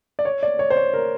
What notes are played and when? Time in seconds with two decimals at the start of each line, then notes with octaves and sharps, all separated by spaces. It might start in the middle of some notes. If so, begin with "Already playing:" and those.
0.19 D5
0.25 C#5
0.43 D5
0.59 C#5
0.70 C5
0.77 C#5
0.94 A#4